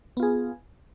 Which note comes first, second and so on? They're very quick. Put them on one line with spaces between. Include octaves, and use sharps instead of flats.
B3 F4 G#4